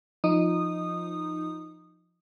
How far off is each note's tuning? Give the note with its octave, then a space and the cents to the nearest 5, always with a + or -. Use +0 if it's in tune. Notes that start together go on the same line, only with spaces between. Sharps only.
F3 +0 D#4 +0 D#6 -15